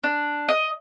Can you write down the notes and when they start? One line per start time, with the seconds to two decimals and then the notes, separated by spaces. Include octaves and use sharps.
0.04 D4
0.49 D#5